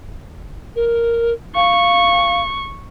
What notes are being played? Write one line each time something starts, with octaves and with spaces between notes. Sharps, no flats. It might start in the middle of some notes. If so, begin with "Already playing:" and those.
A#4
F5 C#6